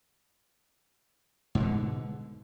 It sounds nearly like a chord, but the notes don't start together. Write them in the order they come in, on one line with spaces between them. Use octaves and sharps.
G#2 E3 B2 D3